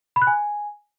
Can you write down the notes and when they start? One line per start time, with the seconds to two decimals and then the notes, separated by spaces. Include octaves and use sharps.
0.16 B5
0.22 F#6
0.27 G#5